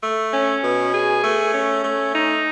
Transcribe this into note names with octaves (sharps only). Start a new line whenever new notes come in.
A3
C#4
B2
G#4
A3
C#4
A3
D#4